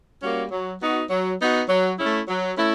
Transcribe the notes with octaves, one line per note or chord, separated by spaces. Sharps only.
G3 A#3 C#4 F#4
F#3
B3 D#4 F#4
F#3
B3 D#4 F#4
F#3
A3 C#4 E4
F#3
A3 C#4 E4